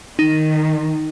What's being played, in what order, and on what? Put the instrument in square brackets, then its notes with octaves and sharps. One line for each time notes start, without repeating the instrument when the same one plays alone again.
[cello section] D#3 [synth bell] D#4